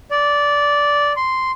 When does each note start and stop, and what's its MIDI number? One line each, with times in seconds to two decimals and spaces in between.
0.11 1.13 74
1.17 1.51 84